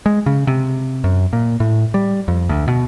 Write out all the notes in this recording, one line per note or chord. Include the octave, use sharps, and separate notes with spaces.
G#3
C#3
C3
F#2
A#2
A2
G3
F2
D2
B2